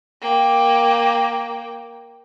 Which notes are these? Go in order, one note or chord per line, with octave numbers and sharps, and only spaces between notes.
A#3 G5